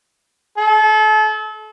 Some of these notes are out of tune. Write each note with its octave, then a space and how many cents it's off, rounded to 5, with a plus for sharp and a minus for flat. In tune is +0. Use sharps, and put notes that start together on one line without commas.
A4 -35